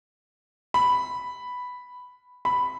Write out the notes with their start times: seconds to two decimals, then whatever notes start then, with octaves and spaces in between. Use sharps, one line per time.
0.74 B5
2.45 B5